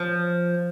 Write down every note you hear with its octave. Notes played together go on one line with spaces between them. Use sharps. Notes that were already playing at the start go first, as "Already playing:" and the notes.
Already playing: F3